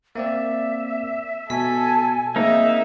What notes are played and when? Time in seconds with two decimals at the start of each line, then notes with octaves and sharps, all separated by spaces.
0.15 A#3 C4 D5 E5
1.50 B2 A4 G#5 B6
2.36 A#3 C4 D#4 G#4 E5